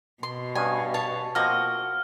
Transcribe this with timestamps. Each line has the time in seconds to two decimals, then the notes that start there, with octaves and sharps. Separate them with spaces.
0.23 B2 C6
0.55 G2 B3 C#4 G#5
0.94 C#5 A5
1.35 F3 A#3 C4 F#4 D#5 F6